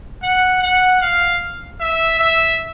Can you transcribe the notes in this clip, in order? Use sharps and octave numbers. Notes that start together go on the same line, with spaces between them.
F#5
F#5
F5
E5
E5